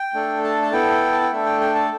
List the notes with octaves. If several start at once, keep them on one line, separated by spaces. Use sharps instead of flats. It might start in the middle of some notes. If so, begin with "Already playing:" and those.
Already playing: G5
A3 D4 A4
A5
A5
B3 E4 A4 G5
A5
G5
A3 D4 A4 E5
G5
G5
A5